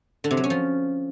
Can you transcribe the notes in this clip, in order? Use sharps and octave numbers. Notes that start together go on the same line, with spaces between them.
D3
C3
F#3
C#4
F3